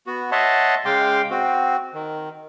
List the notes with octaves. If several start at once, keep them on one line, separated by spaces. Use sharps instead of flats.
B3 F#4
C#5 D#5 E5 F#5 A5 C6
C#3 G#3 F5 G5 C6 D6
C4 F#4
D#3